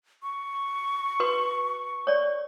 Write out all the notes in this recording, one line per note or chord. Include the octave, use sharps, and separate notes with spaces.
C#6
F#4 B4 C6
C#5 D5